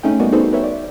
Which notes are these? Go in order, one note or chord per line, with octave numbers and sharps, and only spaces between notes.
A3 C#4 D#4 G#4 G5
G3 B3 F#4 A#4 D5 D#5
D#4 F#4 G#4 A4 B4 C5
A#4 B4 C#5 E5 G5
D5